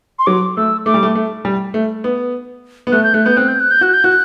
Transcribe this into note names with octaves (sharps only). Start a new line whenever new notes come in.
C6
F#3 D6
A3 E6
A3 D6
G3
A3
A3
G3
A3
B3
B3
A3 F#6
G6
A3 F#6
B3 G6
C4 F#6
G6
F#6
G6
F#4 F#6
G6
F#4 F#6